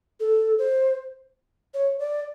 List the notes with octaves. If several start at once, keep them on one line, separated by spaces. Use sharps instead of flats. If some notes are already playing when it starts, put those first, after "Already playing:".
A4
C5
C#5
D5